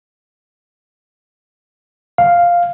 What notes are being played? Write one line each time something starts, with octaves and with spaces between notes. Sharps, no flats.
F5